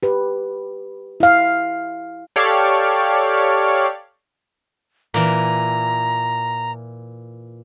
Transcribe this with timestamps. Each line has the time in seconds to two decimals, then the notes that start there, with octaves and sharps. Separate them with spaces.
0.03 G4 B4
1.20 E4 F5
2.36 G4 A4 C#5 D5 F5
5.14 A#2 E3 A#5